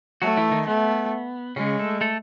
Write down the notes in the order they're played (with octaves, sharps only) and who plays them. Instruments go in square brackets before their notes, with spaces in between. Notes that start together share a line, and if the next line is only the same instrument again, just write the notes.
[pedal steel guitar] F#3 F#4 [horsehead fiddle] A3
[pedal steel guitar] E3 E4
D#3 D#4
[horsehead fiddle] A3 [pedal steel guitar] B3
[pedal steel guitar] C#3 C#4 [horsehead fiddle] G#3
[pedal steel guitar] A3 A4
A3 A4